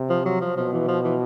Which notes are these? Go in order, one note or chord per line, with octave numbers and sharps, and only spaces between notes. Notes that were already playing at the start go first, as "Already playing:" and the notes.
Already playing: C3
F3
F#3
F3
B2 F3
E3
F3
E3